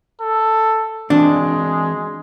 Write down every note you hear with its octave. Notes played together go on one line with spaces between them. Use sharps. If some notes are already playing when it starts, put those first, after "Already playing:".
A4
E3 G#3 C4 D4 F#4